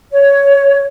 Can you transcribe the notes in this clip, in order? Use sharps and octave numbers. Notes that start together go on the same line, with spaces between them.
C#5